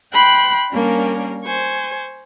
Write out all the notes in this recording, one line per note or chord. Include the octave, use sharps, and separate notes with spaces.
G5 B5 C6 F#6
G3 A#3 C#4 D4 A#4
C5 G#5 C#6